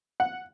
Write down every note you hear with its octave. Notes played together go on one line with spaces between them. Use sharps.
F#5